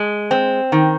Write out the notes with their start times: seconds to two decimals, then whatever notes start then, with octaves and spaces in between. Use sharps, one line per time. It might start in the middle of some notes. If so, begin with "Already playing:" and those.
Already playing: G#3
0.31 C4
0.72 D#3